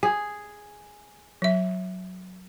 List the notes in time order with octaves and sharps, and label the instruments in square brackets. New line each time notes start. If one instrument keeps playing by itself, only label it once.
[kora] G#4
[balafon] F#3 E5